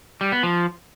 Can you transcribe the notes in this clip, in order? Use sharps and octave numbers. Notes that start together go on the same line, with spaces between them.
G3
B3
F3